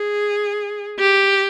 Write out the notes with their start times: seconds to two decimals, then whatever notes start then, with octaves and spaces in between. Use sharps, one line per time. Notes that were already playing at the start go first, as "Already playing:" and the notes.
Already playing: G#4
0.99 G4